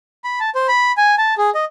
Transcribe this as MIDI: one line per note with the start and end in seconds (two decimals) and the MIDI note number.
0.24 0.39 83
0.40 0.50 81
0.55 0.67 72
0.68 0.92 83
0.97 1.15 80
1.18 1.34 81
1.38 1.50 68
1.55 1.65 75